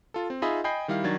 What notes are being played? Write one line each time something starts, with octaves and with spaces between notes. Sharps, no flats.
F4 A4
C4
D#4 F4 G#4 D#5 E5 B5
D#5 G5 G#5 B5 G6 C7
D#3 G3 E4 F5
D#3 F#3 D4 G#6 A6